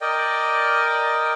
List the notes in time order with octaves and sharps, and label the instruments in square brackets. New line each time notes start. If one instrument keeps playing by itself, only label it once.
[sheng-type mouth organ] A#4 D5 D#5 G5